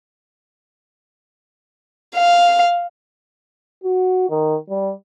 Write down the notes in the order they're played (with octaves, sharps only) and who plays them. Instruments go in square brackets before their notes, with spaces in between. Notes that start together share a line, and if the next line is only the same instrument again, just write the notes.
[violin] F5
[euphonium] F#4
D#3
G3